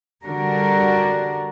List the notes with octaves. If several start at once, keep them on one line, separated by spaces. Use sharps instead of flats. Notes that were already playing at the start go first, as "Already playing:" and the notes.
D3 G3 D4 F#4 A#4